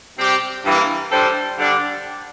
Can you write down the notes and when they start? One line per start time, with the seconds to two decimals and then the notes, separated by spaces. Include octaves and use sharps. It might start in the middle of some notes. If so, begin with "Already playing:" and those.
0.18 C3 G3 C4 G4
0.64 G2 E3 A#3
1.11 G3 D4 A4 C5
1.58 D3 G3 D4